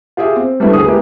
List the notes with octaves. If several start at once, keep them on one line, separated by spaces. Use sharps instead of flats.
F4 G4 G#4 E5
C4
G3 A3 B3 D4 E4
D2 G#4 D#6
G#3 A#3 B3 E4 G4